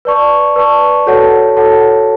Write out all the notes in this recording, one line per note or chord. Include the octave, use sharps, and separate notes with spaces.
B4 D5 A5 C#6
B4 D5 A5 C#6
F#4 A4 C#5 F#5 A5
F#4 A4 C#5 F#5 A5